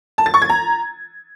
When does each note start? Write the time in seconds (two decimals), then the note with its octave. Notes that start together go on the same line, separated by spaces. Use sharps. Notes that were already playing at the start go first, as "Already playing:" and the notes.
0.18 A5
0.26 A6
0.34 C#6
0.42 G#6
0.50 A#5